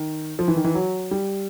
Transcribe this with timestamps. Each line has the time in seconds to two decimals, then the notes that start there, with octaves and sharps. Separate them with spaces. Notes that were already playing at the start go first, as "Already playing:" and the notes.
Already playing: D#3
0.39 F3
0.48 E3
0.56 D#3
0.64 E3
0.75 F#3
1.11 G3